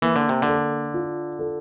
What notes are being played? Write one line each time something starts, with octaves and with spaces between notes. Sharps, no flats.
E3 A#3
D3
C3
D3
A4
F4
A4